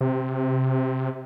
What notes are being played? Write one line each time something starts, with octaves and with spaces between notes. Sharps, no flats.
C3